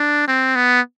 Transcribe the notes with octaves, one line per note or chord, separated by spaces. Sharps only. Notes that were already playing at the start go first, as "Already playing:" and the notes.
Already playing: D4
C4
B3